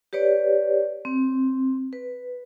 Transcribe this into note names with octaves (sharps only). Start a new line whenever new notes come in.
G4 B4 C#5 D5
C4
B4